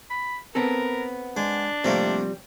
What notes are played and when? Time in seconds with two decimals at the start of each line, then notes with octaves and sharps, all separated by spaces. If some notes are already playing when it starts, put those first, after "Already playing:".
0.10 B5
0.55 B3 C4 A4 A#4
1.37 G#3 D4
1.84 C3 F3 G3 A3 A#3 C4